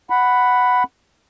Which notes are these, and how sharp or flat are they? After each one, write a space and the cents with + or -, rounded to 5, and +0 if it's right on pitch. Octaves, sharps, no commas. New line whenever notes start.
F#5 +0 B5 +5